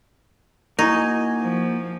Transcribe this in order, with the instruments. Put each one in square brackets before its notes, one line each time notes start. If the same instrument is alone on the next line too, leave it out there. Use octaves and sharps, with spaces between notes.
[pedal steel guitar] A#3 F#4 G#5 [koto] D#4 [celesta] E4 C#6 G#6
[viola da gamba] F3